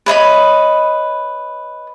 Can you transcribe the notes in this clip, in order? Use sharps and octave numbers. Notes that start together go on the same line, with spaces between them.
B4 C#5 D#5 B5